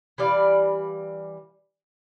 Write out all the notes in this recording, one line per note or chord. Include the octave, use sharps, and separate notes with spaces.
E3 G3 D5 F5